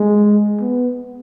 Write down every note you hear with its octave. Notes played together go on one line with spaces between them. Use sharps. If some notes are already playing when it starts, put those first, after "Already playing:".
Already playing: G#3
B3